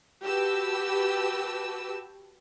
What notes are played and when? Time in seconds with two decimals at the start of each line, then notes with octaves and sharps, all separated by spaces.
0.23 F#4 G4 B4 A5 E6